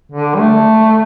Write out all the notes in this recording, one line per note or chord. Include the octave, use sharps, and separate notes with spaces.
D3
G3
A3